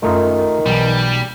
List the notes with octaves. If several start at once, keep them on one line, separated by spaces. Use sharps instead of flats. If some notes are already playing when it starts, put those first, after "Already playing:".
F#2 D#3 A3 D#4 F4
B1 E3 G3